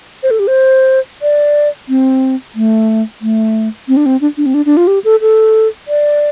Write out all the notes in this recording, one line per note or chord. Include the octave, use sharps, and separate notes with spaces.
C5
A4
G4
C5
D5
C4
A3
A3
C4
D4
C4
D4
D4
C4
D4
D4
F4
G4
A4
A4
D5